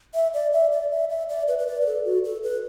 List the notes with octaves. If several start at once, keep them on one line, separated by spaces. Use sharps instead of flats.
E5
D5
E5
D5
E5
E5
D5
B4
B4
D5
B4
A4
F#4
A4
B4